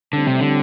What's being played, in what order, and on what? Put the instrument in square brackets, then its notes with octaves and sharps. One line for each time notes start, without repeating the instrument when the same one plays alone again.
[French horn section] A2 G3 C4 [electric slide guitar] D3
[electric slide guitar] C3
D3